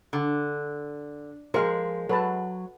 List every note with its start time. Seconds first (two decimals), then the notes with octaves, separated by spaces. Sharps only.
0.13 D3
1.54 F3 G#3 G#4 A#4 C5 F5
2.09 F#3 A4 B4 A5